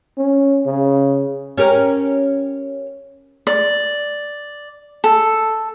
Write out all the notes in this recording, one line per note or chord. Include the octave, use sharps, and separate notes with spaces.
C#4
C#3
C#4 G4 A#4
D5
A4